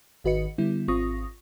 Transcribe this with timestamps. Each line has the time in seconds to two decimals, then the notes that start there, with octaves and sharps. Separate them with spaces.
0.24 G#1 D#3 F#4 B4 D#5 C#7
0.58 D3 G3 B3 E4
0.88 G#1 C4 F4 C#6 D#6 A#6